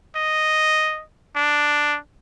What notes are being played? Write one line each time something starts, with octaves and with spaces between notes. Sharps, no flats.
D#5
D4